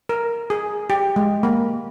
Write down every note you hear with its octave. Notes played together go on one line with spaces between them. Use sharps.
A#4
G#4
G4
G#3
A#3